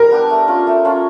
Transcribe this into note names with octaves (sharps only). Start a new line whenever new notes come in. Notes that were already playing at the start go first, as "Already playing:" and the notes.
Already playing: G3 A#4
B3 D4 G4
A3
C#4 F4
A3
C#4 F4